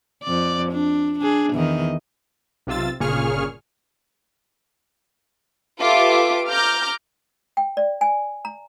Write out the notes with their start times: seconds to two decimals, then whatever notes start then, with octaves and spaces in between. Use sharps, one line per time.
0.23 F2 D5
0.72 D4
1.20 D4 G#4
1.53 E2 D#3 D#5
2.67 B1 C3 F4 E6 A6
3.00 G1 A#2 C#3 G#4 C#6 F6
5.80 F4 G4 A4 B4 E5 D6
6.50 A#5 D6 F6 G6
7.57 G5
7.77 D5
8.01 G#5
8.45 A#5